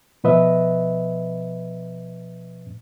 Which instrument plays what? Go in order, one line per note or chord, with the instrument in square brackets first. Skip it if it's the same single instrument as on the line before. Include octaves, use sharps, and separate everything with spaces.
[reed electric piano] B2 F3 B4 D#5 E5